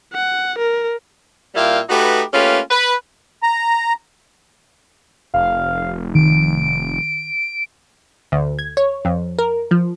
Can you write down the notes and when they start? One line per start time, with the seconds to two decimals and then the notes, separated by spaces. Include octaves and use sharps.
0.13 F#5
0.58 A#4
1.55 A#2 G3 A#3 E4 F5 G5
1.89 A3 D#4 F#4 G4 B4
2.33 A3 A#3 C#4 F4 G4 B4
2.70 B4
3.43 A#5
5.34 F1 F5
6.15 D#3 D7
8.32 D2
8.59 G#6
8.77 C#5
9.05 F2
9.39 A#4
9.71 F3